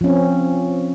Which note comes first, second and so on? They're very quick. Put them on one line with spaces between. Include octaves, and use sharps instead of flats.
F3 C#4 C4